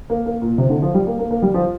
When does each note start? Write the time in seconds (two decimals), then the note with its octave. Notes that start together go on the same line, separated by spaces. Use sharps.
0.10 A#3
0.26 A#3
0.42 A#2
0.58 C3
0.70 D3
0.82 F3
0.94 G3
1.07 A#3
1.19 A#3
1.31 A#3
1.42 G3
1.54 F3